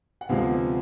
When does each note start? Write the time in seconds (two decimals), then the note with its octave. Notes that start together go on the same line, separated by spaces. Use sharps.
0.21 F#5
0.29 D2 C3 F3 G#3 B3 F5